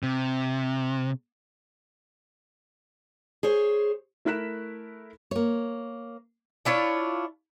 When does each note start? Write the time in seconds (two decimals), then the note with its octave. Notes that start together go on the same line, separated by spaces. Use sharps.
0.03 C3
3.43 G#4 C5 C#5
4.25 A3 E4 A#4 F#6 B6 E7
5.31 A#3 C#5
6.65 D4 E4 F4 C#5